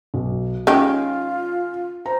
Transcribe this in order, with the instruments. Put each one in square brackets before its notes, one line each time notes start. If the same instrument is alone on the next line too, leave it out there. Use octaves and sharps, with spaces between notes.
[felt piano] B1
[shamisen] D#3 G#3 G4 [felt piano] C#4 [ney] F4
[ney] C5 [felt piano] A#5